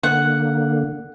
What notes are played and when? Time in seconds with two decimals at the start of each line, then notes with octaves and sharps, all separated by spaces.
0.03 D3 A#3 F#5